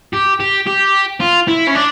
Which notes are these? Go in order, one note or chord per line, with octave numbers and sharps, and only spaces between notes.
G4
G4
G4
F4
E4
C#4
D4